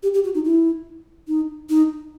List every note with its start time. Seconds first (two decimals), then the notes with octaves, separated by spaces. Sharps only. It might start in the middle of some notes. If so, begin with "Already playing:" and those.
0.03 G4
0.14 G4
0.24 F#4
0.35 D#4
0.45 E4
1.28 D#4
1.69 D#4